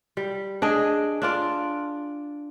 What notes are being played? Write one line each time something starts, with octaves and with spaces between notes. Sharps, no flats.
G3
D4 G#4 D#5
D4 F4 D5